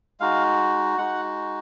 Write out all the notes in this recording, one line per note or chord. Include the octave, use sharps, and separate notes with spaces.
G#3 D#4 F#4 F5
G#3 D#4 F#4 F#5